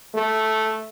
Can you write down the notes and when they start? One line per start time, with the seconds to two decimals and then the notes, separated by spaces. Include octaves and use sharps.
0.14 A3